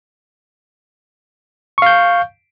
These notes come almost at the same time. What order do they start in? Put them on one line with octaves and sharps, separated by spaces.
C#6 F5 G6